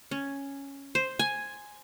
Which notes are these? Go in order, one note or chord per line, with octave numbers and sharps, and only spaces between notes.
C#4
C5
G#5